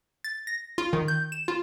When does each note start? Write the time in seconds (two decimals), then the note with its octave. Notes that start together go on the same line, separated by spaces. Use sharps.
0.24 A6
0.47 A#6
0.78 F4
0.93 D#3
1.08 G6
1.32 E7
1.48 F4